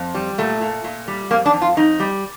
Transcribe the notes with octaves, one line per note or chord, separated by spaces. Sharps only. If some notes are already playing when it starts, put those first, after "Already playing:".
Already playing: F2
G3
A#2 A3
A#2
A#2
G3
F2 A#3
D4
F2
F4
F2 D#4
G3